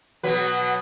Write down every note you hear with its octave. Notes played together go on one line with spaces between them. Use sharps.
B2 F#3 B4